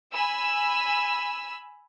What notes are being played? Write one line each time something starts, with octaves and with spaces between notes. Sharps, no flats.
G#5 B5 E6